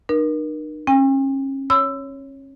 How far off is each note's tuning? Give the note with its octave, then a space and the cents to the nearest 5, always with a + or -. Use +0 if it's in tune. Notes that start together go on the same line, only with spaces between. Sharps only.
D#4 -45 A#4 +30
C#4 -35 G5 +45
C#5 +0 C6 -45 E6 +10